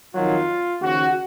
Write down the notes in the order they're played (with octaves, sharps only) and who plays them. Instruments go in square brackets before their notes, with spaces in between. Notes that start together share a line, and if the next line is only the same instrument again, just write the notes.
[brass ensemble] F2 D#3 F#3 F4
D#2 C#3 F3 F#4